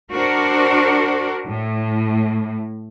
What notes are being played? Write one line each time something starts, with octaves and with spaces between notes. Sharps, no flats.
D4 F#4 A#4 C5
A2